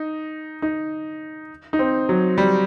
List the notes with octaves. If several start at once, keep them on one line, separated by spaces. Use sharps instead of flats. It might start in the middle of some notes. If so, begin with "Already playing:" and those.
Already playing: D#4
D#4
D#4
C4
F#3
G3